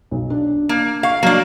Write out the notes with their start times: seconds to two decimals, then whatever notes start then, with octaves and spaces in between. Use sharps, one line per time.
0.11 B1
0.30 D4
0.69 A#3
1.03 F5 C#6
1.23 F#3 A#3 D4